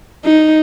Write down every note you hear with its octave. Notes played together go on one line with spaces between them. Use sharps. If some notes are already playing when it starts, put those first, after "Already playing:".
D#4